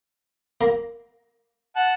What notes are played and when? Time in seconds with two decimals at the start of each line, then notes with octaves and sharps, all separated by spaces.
0.61 A#3 A#5
1.76 F#5 A5 F#6